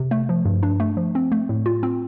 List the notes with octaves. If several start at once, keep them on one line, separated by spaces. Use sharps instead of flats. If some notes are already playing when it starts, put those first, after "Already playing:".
Already playing: C3
A3
F3
G2
D4
A3
F3
C4
A3
A2
F4
C4